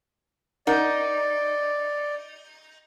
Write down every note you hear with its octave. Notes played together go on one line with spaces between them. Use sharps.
D#4 A#4 D5 F#5